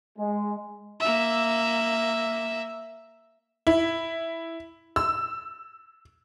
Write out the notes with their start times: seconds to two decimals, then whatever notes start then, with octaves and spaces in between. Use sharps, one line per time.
0.18 G#3
1.00 A#3 E5
3.67 E4
4.96 E6